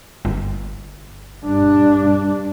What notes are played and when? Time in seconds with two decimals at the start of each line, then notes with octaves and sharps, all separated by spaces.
0.25 G1
1.45 G2 D4